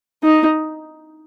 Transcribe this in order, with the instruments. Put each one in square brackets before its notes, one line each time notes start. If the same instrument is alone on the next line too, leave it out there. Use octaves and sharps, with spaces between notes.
[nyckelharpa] D#4